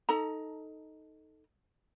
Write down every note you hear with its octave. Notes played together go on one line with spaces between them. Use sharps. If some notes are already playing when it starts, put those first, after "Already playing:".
D#4 A4 A#5